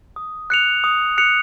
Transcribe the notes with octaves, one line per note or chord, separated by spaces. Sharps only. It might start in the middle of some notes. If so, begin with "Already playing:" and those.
D#6
F#6 C#7 F7
D#6
F#6 C#7 F7